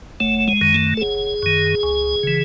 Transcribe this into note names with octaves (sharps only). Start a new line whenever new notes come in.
F#1 A3
G#3
F#2 D#3
A3
A4
F#1 G#4
F#2 D#3
C#2
C#3 E3